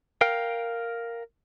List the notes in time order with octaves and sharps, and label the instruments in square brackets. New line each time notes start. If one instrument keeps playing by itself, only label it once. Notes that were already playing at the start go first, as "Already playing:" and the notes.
[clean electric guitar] A#4 F5 G5